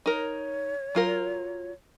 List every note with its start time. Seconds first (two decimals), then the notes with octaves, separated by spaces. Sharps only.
0.06 D#4 A#4 C#5
0.95 F#3 F4 A#4